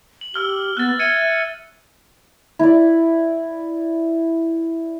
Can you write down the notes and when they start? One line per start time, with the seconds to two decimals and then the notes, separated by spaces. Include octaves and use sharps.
0.21 F#7
0.34 G4 E6 F6 G7
0.77 B3 F#6 A6
0.99 E5 G#6 C#7 D#7
2.59 E4 D5